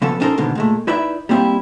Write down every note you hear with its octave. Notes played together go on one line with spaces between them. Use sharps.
C#3 F3 B3 A4
B3 C#4 D#4 A4 A#4 C5
G#2 B2 D3 D#3 B3
A#2 G#3 A3
D#4 E4 B4 D5 E5
G3 A#3 C4 E4 G4